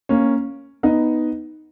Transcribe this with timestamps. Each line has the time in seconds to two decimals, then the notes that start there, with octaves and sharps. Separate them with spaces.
0.09 A#3 C#4
0.83 B3 D#4